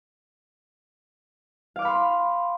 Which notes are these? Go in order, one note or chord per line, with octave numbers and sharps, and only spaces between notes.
F5 B5 C6 D6 F6